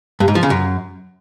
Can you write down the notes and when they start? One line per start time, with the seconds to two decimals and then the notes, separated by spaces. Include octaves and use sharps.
0.20 G2
0.28 G#2
0.35 F3
0.43 C#3
0.50 F#2